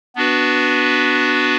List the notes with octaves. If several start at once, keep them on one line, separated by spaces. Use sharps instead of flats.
B3 D4 F#4 B4